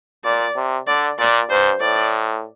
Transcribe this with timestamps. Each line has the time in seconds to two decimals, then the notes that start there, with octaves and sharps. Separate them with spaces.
0.24 A#2 D5
0.56 C3
0.87 D3 D5
1.19 A#2 D5
1.50 G2 C5
1.80 A2 D5